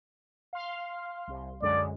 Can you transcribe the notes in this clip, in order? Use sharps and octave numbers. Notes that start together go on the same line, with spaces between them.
F5 C6
C2
F#2 D3 G#3 D5